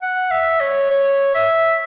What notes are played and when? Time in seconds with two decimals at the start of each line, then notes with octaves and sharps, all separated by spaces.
0.02 F#5
0.31 E5
0.60 C#5
0.90 C#5
1.35 E5